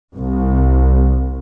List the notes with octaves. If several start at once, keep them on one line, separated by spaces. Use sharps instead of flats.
C2